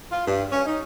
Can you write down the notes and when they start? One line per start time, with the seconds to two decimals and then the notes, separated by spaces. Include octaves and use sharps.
0.11 F4
0.27 G2
0.52 C#4
0.65 D#4